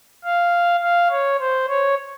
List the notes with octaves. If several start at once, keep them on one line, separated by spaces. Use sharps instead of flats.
F5
F5
C#5
C5
C#5